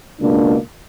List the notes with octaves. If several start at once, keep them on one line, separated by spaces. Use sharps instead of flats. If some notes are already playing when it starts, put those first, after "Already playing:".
C#2 B2 A#3 D4